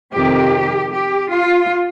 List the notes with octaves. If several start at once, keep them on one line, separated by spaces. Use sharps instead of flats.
F2 C3 D#3 G4
G4
F4